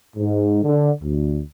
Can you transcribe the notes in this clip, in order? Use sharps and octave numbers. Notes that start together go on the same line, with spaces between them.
G#2
D3
D2